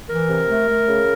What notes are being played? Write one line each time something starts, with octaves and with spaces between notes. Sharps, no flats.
E3 A#4
C3
A3
A3
C#3